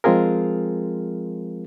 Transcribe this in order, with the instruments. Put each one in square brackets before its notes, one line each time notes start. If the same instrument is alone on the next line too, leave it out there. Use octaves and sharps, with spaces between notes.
[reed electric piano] F3 G#3 C4 F4 G#4 A#4